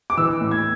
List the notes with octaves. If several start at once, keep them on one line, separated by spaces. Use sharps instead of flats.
D6
E3 E6
A2
G#6